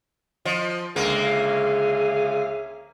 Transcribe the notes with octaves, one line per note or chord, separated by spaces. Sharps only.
F3 D#5
C#2 D3 A#3 G#4 C#5 E5 F5